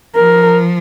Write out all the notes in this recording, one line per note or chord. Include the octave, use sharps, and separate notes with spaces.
F3 A#4